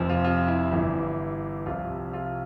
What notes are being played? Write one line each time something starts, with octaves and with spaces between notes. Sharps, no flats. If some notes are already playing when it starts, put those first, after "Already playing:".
Already playing: F1 F2 C3 F3
F4
F4
E4
G1 G2 E3 E4
C2 C3 F3 F4
F4